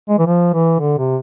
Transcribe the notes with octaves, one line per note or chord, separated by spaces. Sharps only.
G#3
E3
F3
E3
D3
C3